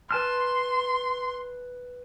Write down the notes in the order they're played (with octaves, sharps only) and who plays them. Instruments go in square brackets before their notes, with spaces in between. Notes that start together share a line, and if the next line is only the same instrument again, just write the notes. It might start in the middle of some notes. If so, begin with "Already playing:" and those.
[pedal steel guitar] B4 A5 F6 [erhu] C6